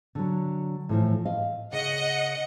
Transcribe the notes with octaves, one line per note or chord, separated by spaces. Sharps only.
D3 F#3
A2 E3 F3
D#5 F5
C#3 D#5 F#5 C#7